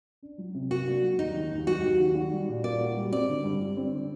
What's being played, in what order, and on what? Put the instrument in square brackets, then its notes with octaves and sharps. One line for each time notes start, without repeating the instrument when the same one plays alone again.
[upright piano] D4
F#3
C3
[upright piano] A#3 [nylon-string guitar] F#4
[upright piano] D4
F#3
[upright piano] D#2 [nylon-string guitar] D#4
[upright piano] D#3
D#2
[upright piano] F#3 [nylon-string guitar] F#4
[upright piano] D#2
D#3
F#4
G3
A#2
[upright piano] A#3 [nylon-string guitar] D5
[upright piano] F#4
G3
[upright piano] C4 [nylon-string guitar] D5
[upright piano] D3
G2
G3
C4
D3